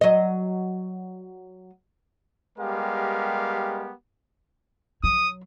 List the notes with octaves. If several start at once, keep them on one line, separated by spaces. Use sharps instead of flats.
F#3 D#5
G3 G#3 B3 G4 A#4 F5
F#3 D#6